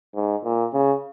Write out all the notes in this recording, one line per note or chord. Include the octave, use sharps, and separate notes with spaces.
G#2
A#2
C#3